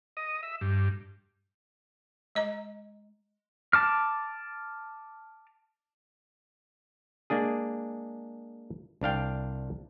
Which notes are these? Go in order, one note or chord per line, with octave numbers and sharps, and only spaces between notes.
D#5
E5
G2
G#3 D#5 A#5
A5 D6 F6
G#3 A#3 D4 G#4
C2 D4 F5 G5